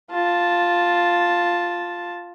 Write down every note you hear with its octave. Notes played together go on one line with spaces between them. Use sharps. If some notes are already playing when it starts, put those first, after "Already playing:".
F4 A5